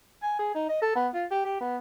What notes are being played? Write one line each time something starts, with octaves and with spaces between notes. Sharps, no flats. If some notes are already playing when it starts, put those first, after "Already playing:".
G#5
G#4
D#4
D#5
A4
B3
F4
G4
G4
B3